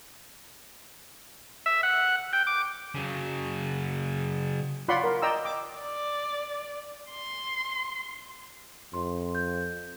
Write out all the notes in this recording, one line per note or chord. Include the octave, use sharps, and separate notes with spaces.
E5
F#5
G5
D6
C#3 F#3
F4 C#5 D5 F#5 B5 C6
A#4
D5 D#5 G5 A#5 E6
D6
D5
C6
F2 C6
G6